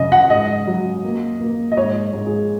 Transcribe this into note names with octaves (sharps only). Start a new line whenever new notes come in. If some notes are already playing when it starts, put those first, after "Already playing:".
Already playing: F#2 C#3 D#5
F#5
G#2 D#5
F#3
A#3
A#3
D#5
G#2 C#5
G#2
G#4